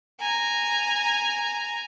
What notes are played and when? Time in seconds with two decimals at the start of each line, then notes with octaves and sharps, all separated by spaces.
0.20 G#5 A#5